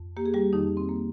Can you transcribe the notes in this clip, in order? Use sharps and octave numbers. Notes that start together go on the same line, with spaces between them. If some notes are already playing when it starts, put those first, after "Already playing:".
Already playing: F2
A#3 G4
G#4
G3 G4
F2 D#3 D#4
C4
A#3